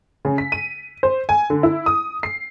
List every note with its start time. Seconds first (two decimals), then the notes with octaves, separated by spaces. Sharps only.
0.25 C#3
0.38 B6
0.52 D#7
1.03 C5
1.29 G#5
1.50 D3
1.63 E4
1.86 D#6
2.23 C7